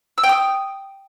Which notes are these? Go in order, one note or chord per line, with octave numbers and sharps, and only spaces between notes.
E6
G5
D#6